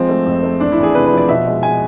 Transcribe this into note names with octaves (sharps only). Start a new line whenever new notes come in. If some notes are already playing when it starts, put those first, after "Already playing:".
Already playing: F3 G#3 C4
A3
F2
A3
E2 D4
E4
E2
G#4
C3 B4
B4
F3
D5
B2 E5
G#3
G#3 G#5